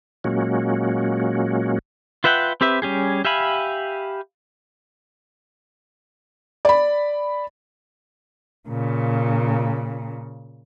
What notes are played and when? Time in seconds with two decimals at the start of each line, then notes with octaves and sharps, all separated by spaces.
0.24 A#2 F#3 G#3 A#3 C#4 F#4
2.24 F4 B4 E5 F#5 G5
2.61 C4 G4 B4 E5
2.82 G3 C#4 G4 G#4
3.25 G4 E5 F5 G#5 B5
6.65 D5 B5
8.69 A#2 C#3